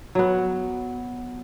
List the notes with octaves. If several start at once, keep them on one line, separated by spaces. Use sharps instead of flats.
F#3 B3